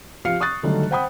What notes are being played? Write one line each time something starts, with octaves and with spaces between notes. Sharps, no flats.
F3 G4 F5 F6 C7 C#7
C#6 D#6 F#6 A6
D3 D#3 F#3 G3 A3 D#4
C5 F#5 G5 B5 D#6